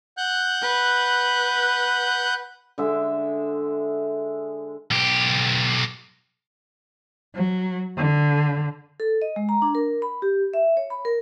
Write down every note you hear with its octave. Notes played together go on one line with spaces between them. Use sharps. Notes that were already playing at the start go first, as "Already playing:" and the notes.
F#5 F#6 G6
B4
D3 G#3 E5
B1 G4
F#3
D3
A4
D#5
G#3
A#5
D4
A#4
B5
G4
E5
C#5
B5
A#4